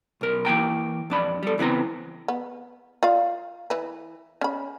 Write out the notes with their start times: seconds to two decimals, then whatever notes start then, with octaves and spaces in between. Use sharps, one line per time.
0.21 B1 A#4
0.45 E3 A#3 G5 A#5
1.10 F2 D4 B5
1.43 G3 A4
1.58 C#2 E3 B3 C4 A#5
2.28 B3
3.03 F4 D5 F5
3.70 E3 B4
4.41 C#4 B5